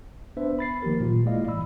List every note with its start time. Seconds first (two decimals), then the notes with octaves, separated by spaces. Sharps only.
0.37 B3 D4 B4 C5 E5
0.59 B5 A6 C7
0.82 D#3 F3 A#3 G4 A#4
1.00 A#2 F#3 F4
1.26 G#3 A#3 E4 D5 D#5 F5
1.47 G1 A2 E3 B5 E6